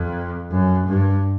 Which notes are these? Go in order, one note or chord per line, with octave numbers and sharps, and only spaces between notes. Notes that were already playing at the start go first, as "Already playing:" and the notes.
Already playing: F2
F#2
G2